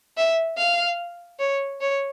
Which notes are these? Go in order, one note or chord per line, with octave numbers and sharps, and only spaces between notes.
E5
F5
C#5
C#5